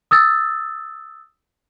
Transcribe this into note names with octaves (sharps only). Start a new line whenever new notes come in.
D#6 E6 A6